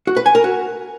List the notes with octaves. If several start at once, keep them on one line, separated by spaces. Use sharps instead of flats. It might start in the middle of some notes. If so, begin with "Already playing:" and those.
F#4
B4
G#5
A#4
F#4